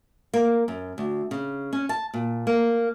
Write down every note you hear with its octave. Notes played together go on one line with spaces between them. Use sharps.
A#3
F#2
D2
C#3
C#4
A5
A#2
A#3